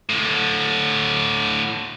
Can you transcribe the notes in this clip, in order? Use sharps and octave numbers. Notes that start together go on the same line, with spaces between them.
A2 D3